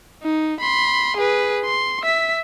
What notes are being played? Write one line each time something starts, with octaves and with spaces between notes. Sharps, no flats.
D#4
B5 C6
G#4 B4
C6
E5 B6